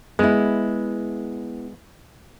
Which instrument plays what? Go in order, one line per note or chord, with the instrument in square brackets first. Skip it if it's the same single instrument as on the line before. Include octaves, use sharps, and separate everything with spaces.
[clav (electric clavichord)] G#3 [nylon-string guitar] B3 E4